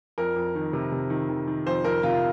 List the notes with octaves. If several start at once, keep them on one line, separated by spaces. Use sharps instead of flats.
F2 A#4
F2
D#3
C3
C3
D#3
D#3
D#3
F2 C5
F2 A#4
C3 F4